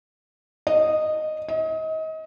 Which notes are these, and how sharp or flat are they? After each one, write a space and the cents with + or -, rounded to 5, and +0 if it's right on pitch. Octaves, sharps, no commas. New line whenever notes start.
D#5 -10
D#5 +30